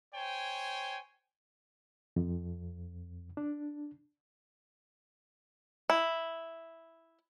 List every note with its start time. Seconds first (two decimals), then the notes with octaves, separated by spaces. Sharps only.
0.14 C5 C#5 G5 G#5
2.16 F2
3.37 D4
5.90 E4